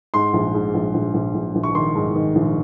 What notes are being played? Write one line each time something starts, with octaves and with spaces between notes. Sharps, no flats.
G#2 C6
A#1
G#2
A#1
A#1
A#1
A#1
A#1
C#6
D#3 C6
G#2
D#3
A#1